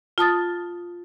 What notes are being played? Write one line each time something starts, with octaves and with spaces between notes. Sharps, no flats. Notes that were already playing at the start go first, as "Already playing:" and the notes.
F4 A5 D#6 A6